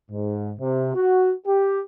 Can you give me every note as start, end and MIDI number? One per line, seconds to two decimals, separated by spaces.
0.11 0.53 44
0.59 0.94 48
0.95 1.32 66
1.47 1.79 67